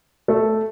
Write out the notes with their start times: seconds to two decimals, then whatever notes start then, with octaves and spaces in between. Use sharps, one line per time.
0.28 A3 A4